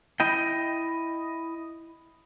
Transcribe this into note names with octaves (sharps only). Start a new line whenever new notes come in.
E4 D#5 G5